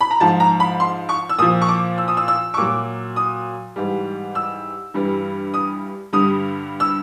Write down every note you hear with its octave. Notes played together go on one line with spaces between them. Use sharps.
B5
A#5
G#2 F3 A5
A#5
B5
C6
C#6
E6
A#2 F3 D#6
C#6
D6
E6
D#6
E6
E6
C#6
A#2 F#3 D6
D#6
G#2 E3 G3
E6
G2 E3 G3
D#6
G2 D3 G3 D#6
E6